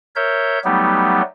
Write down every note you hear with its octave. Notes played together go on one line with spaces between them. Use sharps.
A#4 C#5 E5 G6
F#3 G3 A3 B3 D#4 G4